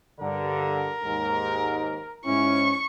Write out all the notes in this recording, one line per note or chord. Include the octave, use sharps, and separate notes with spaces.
G2 D3 A#4
D#2 G#2
G#2 C#4 E4 C#6